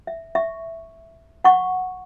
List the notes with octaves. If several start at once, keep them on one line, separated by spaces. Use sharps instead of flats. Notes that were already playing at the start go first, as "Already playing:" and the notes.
E5
E5 C#6
F#5 C#6